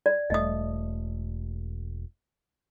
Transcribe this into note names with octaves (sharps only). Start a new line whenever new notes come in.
D5
E1 A3 D#5 D#6